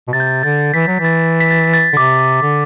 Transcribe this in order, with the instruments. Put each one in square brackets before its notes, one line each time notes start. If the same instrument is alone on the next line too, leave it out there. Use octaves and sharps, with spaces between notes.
[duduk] B2
[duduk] C3 [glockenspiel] A6
[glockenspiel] G6
A6
[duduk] D3 [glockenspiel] A6
[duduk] E3 [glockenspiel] B6
[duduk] F#3
[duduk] E3 [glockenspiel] A6
[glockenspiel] B6
A6
A6
[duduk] D3
[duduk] C3 [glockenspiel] D6
[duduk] D3